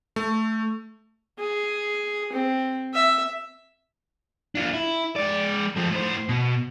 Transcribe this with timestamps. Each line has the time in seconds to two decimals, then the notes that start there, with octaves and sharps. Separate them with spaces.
0.16 A3
1.39 G#4
2.33 C4
2.94 E5
4.55 D4 F4
4.73 E4
5.16 G#3 D5
5.76 F3 A3
5.90 A2 C5
6.29 B2